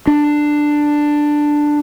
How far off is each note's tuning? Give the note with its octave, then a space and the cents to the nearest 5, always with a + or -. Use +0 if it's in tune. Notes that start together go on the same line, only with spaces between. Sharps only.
D4 +10